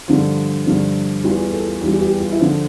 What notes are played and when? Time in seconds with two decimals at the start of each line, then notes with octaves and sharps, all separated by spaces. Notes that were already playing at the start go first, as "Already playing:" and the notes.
0.08 G2 D3 F3 F4
0.66 G2 D3 F3
1.24 E2 E3 G3 F4
1.39 F4
1.52 A4
1.67 F4
1.81 E2 E3 G3 F4
2.01 G4
2.20 F4
2.32 E4
2.40 D3 F3 F4